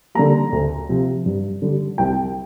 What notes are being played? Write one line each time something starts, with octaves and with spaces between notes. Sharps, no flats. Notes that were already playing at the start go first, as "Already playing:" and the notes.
D3 G3 A#3 A#5
D2
C3 F3 C4
G2
D3 G3
C2 G5